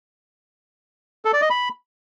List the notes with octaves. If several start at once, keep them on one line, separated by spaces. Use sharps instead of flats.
A4
D5
D#5
B5